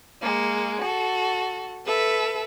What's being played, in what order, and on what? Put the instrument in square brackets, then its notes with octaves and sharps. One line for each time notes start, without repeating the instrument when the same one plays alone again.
[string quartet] G#3 A#3
F#4 A4
A4 B4 E5